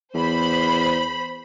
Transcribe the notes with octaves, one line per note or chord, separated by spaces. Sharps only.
E2 C5 B5